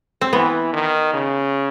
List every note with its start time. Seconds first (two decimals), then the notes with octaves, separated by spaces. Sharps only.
0.21 C4
0.33 E3 B3
0.73 D#3
1.13 C#3